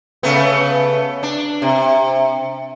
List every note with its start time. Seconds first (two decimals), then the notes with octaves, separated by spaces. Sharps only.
0.23 C#3 A3 B3
1.23 D4
1.62 C3